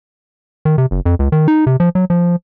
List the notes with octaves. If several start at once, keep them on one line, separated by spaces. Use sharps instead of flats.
D#3
C3
F#1
F2
C#2
D#3
D#4
C3
F3
F#3
F3